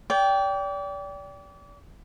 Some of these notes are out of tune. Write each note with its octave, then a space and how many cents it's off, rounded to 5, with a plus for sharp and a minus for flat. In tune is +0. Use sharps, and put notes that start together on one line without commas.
D5 -35 G5 +0